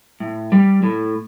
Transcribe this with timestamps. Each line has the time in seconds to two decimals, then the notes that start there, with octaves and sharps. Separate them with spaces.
0.20 A2
0.52 G3
0.83 A2